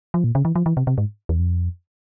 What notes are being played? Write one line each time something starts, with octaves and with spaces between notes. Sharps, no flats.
F3
A#2
C#3
E3
F3
E3
C3
C3
G#2
E2
F2